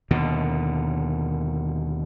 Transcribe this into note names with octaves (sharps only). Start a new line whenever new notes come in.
D#2 B2 D3